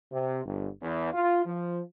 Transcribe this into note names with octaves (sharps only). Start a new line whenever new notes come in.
C3
G1
E2
F4
F3